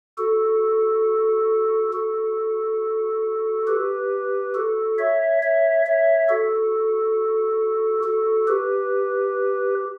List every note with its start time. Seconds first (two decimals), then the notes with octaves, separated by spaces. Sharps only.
0.18 F#4 A4
1.93 F#4 A4
3.67 G4 B4
4.55 F#4 A4
4.98 C#5 E5
5.42 C#5 E5
5.86 C#5 E5
6.29 F#4 A4
8.03 F#4 A4
8.47 G4 B4